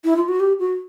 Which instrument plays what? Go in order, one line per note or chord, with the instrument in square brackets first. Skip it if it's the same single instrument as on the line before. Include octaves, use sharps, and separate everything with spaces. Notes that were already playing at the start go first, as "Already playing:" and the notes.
[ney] E4
F4
F#4
G4
F#4